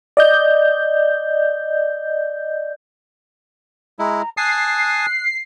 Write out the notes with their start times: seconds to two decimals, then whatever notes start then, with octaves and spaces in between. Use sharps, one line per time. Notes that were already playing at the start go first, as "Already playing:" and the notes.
0.17 D5 D#5 G6
3.99 G#3 E4 A#5
4.37 G#5 A5 D#6 F#6 C7